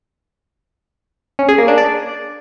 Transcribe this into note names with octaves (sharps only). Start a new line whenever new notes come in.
C#4
G#4
A#3
D4
D5